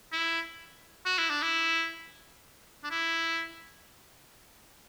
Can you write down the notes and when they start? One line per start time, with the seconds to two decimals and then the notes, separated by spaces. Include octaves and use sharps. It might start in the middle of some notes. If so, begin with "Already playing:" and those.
0.12 E4
1.06 F#4
1.18 E4
1.30 D4
1.43 E4
2.84 D4
2.90 E4